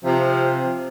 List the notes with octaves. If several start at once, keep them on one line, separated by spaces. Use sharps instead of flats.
C3 F3